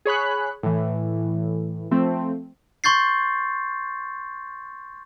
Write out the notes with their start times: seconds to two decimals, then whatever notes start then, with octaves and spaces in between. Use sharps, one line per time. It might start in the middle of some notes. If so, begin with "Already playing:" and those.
0.05 G#4 C#5 B5 F#6
0.63 A2 E3
1.91 F3 A3 C4
2.84 C6 C#6 G6 A6 C7